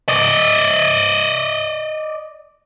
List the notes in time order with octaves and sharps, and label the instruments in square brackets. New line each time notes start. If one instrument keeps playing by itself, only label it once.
[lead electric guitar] D5 D#5